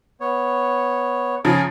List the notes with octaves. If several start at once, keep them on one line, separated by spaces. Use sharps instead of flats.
B3 C#5
C#3 F3 G#4 G#5 A#5